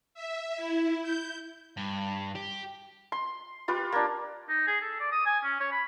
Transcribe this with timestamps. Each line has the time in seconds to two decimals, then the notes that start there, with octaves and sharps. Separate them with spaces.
0.14 E5
0.56 E4
1.02 G6
1.77 G2
2.35 G4
3.12 C6
3.68 F4 G4 B4
3.92 A#3 D4
4.49 D#4
4.67 G#4
4.82 A4
5.00 D5
5.12 D#6
5.26 G#5
5.44 C#4
5.60 C#5
5.72 B5